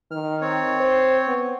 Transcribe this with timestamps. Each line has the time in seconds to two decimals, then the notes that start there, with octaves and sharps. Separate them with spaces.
0.11 D#3 F6
0.42 C4 C#5
0.80 C5
1.27 B3